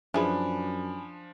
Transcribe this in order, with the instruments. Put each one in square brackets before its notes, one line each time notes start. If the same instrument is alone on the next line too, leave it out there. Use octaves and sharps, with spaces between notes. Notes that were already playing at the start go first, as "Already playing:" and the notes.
[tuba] F#2 [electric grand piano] F3 D4 [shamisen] E4 G#4 B4 [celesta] G#5 B5